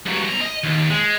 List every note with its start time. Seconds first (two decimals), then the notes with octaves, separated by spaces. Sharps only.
0.06 G2 F#3
0.25 B1 A#5
0.41 D#5
0.64 D#2
0.90 G#3